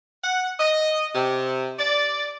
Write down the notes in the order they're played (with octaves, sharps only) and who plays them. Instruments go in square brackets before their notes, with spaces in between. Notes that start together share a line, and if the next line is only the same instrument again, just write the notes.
[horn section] F#5
D#5
C3
D5